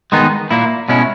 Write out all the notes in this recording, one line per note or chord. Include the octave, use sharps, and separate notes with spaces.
D#3 G#3 B3 D#4
A#2 A#3 E4
B2 G#3 C#4 E4